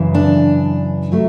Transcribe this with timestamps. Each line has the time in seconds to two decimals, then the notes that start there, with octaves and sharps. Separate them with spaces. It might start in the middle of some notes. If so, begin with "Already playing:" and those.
Already playing: F#2 C#3 E3
0.14 D4
1.12 F#3 A3